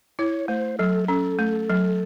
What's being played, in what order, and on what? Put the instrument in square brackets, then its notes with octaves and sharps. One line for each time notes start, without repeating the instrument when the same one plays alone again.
[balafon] E4 [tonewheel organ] C#5
[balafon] A3 [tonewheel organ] C5
[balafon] F#3 [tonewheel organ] A4
[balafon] C#4 [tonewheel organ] A4
[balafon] A3
F#3